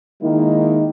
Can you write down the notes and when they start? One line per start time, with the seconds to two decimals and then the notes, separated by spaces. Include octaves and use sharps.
0.22 D#3 G#3 A#3 D#4 E4